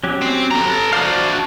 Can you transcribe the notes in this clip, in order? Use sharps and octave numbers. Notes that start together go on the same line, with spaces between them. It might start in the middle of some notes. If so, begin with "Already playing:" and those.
F#3 C#4 G4
C4
A4 A#5
D4 F#4 C5 D5 F5